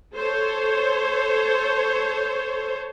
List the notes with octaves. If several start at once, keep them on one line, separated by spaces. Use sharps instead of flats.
A4 C5 C#5